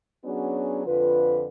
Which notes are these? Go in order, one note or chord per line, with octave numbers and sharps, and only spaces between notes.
F#3 B3 C#4 D4 F#4 G#4
F2 D3 F4 B4